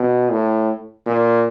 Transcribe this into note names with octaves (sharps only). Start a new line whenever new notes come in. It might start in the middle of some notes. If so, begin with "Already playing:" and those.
Already playing: B2
A2
A#2